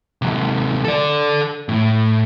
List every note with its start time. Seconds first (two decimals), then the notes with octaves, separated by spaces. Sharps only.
0.22 C3 F#3
0.85 A4 D5
1.69 A2